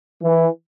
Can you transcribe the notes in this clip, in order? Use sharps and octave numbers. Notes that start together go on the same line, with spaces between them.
E3